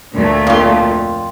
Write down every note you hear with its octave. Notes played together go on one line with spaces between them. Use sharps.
D2 A#2 A3
F2 F4